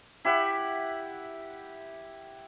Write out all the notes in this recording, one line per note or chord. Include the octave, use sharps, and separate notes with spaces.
E4 G4 E5 F#5